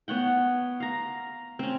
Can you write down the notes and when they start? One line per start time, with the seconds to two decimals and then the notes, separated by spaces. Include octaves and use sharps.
0.08 B3 C#5 F#5 G5
0.80 F5 A#5
1.59 C4 C#4